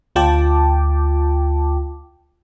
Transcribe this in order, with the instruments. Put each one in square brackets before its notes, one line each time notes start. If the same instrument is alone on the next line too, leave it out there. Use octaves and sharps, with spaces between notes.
[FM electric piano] D2 F4 G5 A5 D6